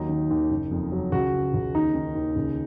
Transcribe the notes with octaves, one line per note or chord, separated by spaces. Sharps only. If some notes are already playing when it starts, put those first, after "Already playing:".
Already playing: D#2 F#3 D#4
D#3
D#2
F#1
F2
F#3
C#2 F#4
C#3
C#2
D#2 D#4
D#3
D#2
C#2